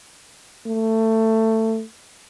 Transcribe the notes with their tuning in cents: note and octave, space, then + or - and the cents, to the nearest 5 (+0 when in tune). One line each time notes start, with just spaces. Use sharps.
A3 +20